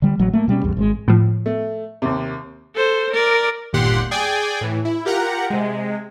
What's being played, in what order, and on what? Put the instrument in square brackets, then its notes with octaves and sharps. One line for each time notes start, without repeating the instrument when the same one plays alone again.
[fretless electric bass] D3 G3
A1 F#3
A3 A#3
B2 G3 B3 C#4
A#1 E2 G3
G#1 C3 G#3
[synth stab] A2 F3
[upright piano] A3
D#2 C3
[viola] A4 C5
A#4 D5
[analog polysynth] G1 D#2 A#2 G4 F#5 C6
G#4 D5 G5 G#5
A2 E3
E4
F4 G4 A#4 F#5 A#5
C3 G#3